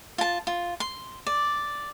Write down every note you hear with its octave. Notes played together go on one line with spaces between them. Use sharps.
F4 A5
F4
C6
D5